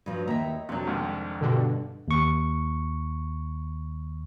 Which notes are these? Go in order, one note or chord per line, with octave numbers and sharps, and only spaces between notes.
G2 F3 F#3
D#2 E5 A#5
F2 C3 F#3 D4
C2 G#2 D#3
G2 B2 D3
D#2 C#6